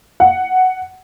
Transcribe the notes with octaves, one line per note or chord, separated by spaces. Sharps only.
F#5